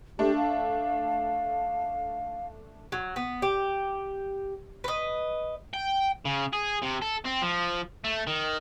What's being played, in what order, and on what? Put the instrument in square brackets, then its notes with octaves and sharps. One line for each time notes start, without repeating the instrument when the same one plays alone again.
[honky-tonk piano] A3 D4 [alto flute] G4
[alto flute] F5
[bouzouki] F#3
B3
G4
B4 D#5
[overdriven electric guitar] G5
C#3
G#4
C3
A4
C4
F3
A3
D#3